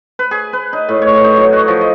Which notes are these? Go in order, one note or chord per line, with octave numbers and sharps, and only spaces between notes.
B4
G#4
B4
D#4
A2
C#5
D#4
F#3
F#4
F3
D#5